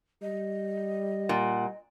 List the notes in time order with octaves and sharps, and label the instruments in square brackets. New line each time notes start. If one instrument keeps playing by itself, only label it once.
[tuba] G3 [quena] D#5
[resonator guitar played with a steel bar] A#2 [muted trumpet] F#5